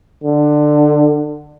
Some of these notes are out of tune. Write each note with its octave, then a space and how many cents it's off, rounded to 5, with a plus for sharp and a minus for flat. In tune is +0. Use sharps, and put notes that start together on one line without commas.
D3 +20